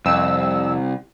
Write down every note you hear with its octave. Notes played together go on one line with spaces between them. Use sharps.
C2 F2 E6